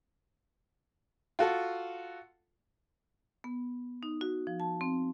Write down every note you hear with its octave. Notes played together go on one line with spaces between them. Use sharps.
F4 F#4 A4
B3
D#4
F#4
F3
A5
C4